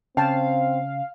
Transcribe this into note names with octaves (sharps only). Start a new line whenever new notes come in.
C#3 C4 F5 G5 A5